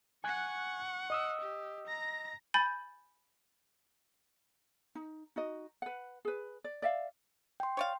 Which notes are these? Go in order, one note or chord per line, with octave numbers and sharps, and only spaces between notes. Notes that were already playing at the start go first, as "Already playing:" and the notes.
F#5 G#5 C#6 F#6 G#6
D#5 D#6 E6
G4
A#5 A#6
G#5 B5 G6 A6
D#4
D#4 F#4 D#5
B4 F#5
G#4 B4
D5
D5 E5 F5
G5 C6
C#5 D5 F5